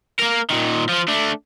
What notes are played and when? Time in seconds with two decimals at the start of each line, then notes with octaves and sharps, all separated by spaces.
0.19 A#3 A#4
0.50 A#2 D#3
0.89 F3 F4
1.08 A3 D4